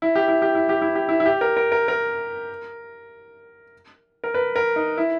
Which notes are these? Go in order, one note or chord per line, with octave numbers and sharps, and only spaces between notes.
E4
G4
E4
G4
E4
G4
E4
G4
E4
E4
G4
A#4
A#4
A#4
A#4
A#4
B4
A#4
D#4
E4